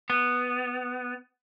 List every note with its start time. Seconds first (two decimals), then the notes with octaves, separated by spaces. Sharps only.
0.10 B3